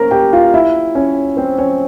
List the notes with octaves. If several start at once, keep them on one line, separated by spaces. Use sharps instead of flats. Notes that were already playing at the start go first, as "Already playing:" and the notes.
Already playing: A#3 C#4 A#4 C5 A#5
G4 G5
F4 F5
E4 E5
C#4 C#5
C4 C5
C#4 C#5